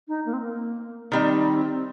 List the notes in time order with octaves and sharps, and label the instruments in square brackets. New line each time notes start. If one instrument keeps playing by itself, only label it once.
[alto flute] D#4
A#3
C4
A#3
[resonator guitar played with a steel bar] D#3 G3 D#4 [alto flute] C4